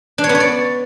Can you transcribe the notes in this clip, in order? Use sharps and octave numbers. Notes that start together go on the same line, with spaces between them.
D4
C#5
B3
C#5
D5